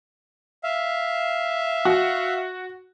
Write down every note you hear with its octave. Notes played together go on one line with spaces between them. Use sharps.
E5 F5
F#4